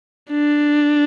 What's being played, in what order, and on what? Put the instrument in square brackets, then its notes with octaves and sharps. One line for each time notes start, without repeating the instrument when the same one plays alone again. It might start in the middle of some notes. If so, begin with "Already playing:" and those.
[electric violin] D4